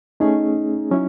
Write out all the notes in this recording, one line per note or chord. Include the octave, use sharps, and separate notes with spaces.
A3 C#4 D#4 G#4
F#3 C#4 E4